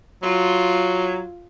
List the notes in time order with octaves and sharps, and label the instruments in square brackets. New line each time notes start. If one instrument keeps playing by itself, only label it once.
[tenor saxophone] F#3 [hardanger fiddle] F4